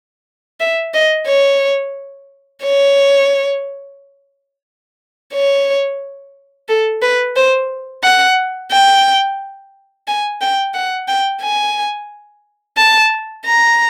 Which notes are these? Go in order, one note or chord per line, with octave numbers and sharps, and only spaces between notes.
E5
D#5
C#5
C#5
C#5
A4
B4
C5
F#5
G5
G#5
G5
F#5
G5
G#5
A5
A#5